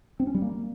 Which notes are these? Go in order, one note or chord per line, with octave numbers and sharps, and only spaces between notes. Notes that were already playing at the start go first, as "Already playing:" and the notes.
C4
C#4
G3
A#3